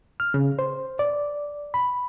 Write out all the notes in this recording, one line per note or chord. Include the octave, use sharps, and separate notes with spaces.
F6
C#3
C5
D5
B5